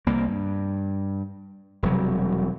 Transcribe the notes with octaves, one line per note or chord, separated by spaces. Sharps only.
C2 A#3
G2
E1 C3 F#3 G3